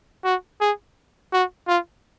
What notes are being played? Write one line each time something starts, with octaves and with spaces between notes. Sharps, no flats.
F#4
G#4
F#4
F4